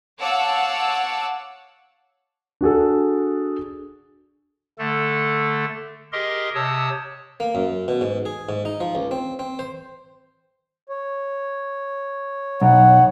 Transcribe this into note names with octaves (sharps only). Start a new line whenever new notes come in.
C#5 F5 F#5 A5 D6 E6
D4 F#4 G#4 A4
D3 A3 A4
G4 G#4 A#4 D#5 C6
C3 C#5 A5 D#6 E6
A#3
F#2
B2
G#2
G#4
G#2
D#4
F3
C#2
C4
C4
C5
C#5
B1 F#5